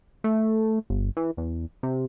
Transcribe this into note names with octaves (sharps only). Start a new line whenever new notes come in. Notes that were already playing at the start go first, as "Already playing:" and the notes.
A3
G1
E3
E2
C3